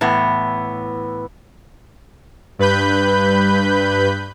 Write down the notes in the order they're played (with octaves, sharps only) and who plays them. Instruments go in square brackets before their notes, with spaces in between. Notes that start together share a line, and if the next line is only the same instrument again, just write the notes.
[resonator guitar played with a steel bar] A2 E3 B3
[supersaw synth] G2 B4 B5 G6